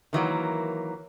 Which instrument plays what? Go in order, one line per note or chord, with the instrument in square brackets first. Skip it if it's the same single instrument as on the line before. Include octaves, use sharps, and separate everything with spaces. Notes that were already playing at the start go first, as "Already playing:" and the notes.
[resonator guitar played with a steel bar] D#3 E3 F#3 A#3